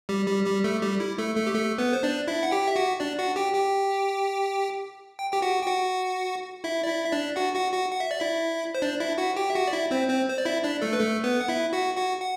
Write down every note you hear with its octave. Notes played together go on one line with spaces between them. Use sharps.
G3 G4
G3 G4
G3 G4
A3 A4
G3 G4
E4
A3 A4
A3 A4
G4
A3 A4
B3 B4
C5
D4 D5
E4 E5
F#5
G4 G5
E5
F#4 F#5
D4 D5
F#4 F#5
G4 G5
G4 G5
G5
G4 G5
F#4 F#5
G5
F#4 F#5
E4 E5
D5
E4 E5
E5
D4 D5
F#4 F#5
F#4 F#5
F#4 F#5
F#5
E5
D5
E4 E5
C5
D4 D5
E4 E5
F#4 F#5
G4 G5
E5
F#4 F#5
D5
E4 E5
C4 C5
C4 C5
C5
D5
E4 E5
D4 D5
A3 A4
B4
A3 A4
B3 B4
F#5
E4 E5
F#4 F#5
F#4 F#5
F#5